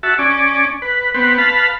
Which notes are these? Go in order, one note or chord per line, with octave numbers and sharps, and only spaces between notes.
F#4 E5 A5
C#4 D5 G#5
B4
B3 C4 B4
B4 F5 A5 B5